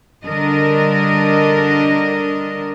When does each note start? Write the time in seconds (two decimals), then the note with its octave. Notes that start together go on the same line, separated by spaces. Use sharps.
0.25 D3 G3 D4 A#4 D#5